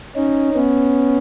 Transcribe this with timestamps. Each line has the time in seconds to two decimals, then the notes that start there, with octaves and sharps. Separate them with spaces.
0.15 C#4 D#4
0.54 B3 C#4